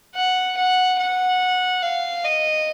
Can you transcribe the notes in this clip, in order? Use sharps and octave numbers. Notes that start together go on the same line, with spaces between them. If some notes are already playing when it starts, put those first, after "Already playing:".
F#5
F#5
F#5
F5
D#5